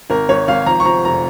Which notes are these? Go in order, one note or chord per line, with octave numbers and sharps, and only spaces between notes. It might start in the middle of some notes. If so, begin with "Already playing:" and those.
G#1 A#4
G#1 C#5
G#1 F5
F3 A#5
C#6
F3 A#5
F1 A#5